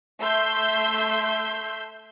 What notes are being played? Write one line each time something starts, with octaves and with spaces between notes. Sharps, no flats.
A3 E5 C6 E6 G6